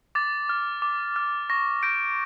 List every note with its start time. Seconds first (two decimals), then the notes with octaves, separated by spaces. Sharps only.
0.15 D6 A6
0.49 F6
0.82 D6
1.16 F6
1.50 C#6 A#6
1.83 G6 A#6 D7